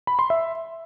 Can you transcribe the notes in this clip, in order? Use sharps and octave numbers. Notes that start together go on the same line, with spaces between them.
B5
C6
E5